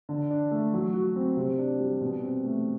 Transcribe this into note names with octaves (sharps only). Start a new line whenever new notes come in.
D3
D4
A3
F#3
F#4
C4
C3
D4
G3
B2
C4
A3